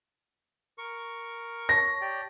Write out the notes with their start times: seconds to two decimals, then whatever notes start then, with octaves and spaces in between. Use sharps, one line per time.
0.78 A#4 C#6
1.69 C#5 A5 C#6 A#6
2.01 G4 D5 G5